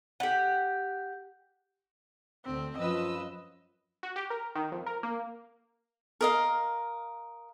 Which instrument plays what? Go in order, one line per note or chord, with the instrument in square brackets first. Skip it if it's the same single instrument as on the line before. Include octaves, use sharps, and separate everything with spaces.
[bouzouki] G4 F#5
[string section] D2 [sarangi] C4
[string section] F#2 B4 E6 [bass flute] F3 [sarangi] D#5
[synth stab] F#4
G4
A#4
D#3
F2
A#4
A#3
[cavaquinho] A#4 D#5 F5